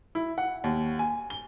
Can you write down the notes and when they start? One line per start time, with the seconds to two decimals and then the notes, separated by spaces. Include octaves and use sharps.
0.15 E4
0.38 F#5
0.64 D#2
0.99 G#5
1.30 G7